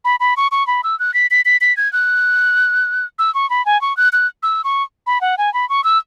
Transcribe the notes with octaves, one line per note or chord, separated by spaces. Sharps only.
B5
B5
C#6
C#6
B5
E6
F#6
B6
B6
B6
B6
G#6
F#6
E6
C#6
B5
G#5
C#6
F#6
F#6
E6
C#6
B5
F#5
G#5
B5
C#6
E6